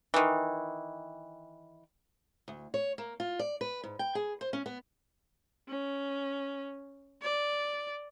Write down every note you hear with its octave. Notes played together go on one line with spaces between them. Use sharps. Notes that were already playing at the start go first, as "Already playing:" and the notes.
D#3 E3
D2
C#5
A#3
F4
D5
B4
G#2
G5
G#4
C5
C#4
B3
C#4
D5